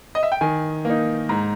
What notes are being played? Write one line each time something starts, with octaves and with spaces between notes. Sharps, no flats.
D#5
E5
G5
D#3 G#5
A#3 D#4
G#2 A#5